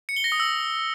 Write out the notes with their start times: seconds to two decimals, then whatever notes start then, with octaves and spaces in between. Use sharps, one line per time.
0.09 C#7
0.16 G7
0.24 A#6
0.32 D#6
0.40 E6